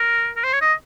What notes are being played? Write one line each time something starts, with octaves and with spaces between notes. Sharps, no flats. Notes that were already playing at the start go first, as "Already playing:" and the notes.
Already playing: A#4
A#4
C5
C#5
D#5